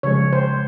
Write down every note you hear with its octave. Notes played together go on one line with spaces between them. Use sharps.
C#3 F3 G#3 C#5
C5